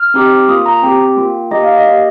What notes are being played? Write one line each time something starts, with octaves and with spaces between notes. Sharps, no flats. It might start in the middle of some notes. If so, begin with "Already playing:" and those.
Already playing: F6
C4 D#4 G4
A#3 F4 D#6
A#5
C4 G4 G5
A#3 F4
A#3 D#4 G4 D#5
F5
D#5
A#3 G4